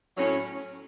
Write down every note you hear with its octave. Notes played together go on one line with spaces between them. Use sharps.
A2 F#3 C#4